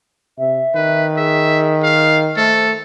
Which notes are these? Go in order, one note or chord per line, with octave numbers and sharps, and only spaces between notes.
C3 E5
D#3 B4
G#4 E5
F5
A3 A4 C5